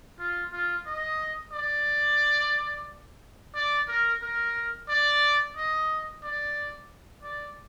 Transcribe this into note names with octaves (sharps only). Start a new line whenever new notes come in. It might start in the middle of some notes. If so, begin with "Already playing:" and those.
F4
F4
D#5
D5
D5
A#4
A#4
D5
D#5
D5
D5